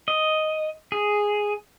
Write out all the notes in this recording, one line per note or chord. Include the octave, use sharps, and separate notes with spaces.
D#5
G#4